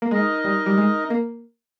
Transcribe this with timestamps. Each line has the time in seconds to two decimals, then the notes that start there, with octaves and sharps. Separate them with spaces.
0.02 A#3
0.11 G#3 D#4 A#4 D#5
0.45 G3
0.66 G3
0.78 G#3
1.10 A#3